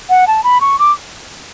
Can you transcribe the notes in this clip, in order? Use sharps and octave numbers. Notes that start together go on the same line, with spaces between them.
F#5
A5
B5
C#6
D6